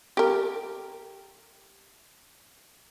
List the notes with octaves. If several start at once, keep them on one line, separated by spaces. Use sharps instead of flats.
G4 A#4